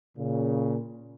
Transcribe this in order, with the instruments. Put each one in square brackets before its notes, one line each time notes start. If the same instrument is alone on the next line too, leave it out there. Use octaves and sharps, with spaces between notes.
[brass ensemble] A#2 C#3